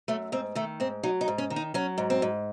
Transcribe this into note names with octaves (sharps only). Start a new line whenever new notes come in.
F#2 A3
G#2 C4
D#3 A3
G#2 C4
F#3 D#4
D#4
G#2
C#4
D#3
D#4
F#3 C#4
G#2
C4
G#2